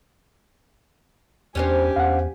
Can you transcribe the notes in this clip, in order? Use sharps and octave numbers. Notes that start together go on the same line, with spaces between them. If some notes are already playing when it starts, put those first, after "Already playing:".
E2 C#4 D4 G4 C5 G#5
E2 F5 F#5